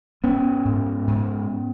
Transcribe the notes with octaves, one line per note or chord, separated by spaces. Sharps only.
G#2 B3 C#4
G#2
G#2